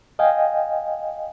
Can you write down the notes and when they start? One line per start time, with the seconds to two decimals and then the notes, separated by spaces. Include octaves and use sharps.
0.19 D#5 F5 G5 G#5